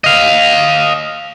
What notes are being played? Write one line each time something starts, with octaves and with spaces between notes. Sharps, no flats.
D#5 F5